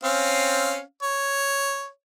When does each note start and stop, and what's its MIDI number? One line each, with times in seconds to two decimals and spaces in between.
0.04 0.80 60
0.04 0.80 61
0.04 0.80 77
1.03 1.88 73